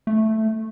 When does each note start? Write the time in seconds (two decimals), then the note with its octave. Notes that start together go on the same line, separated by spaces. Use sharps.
0.07 A3